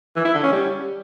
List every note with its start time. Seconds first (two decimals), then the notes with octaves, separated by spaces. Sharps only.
0.16 E3
0.25 E4
0.34 D3
0.43 C#4
0.52 G3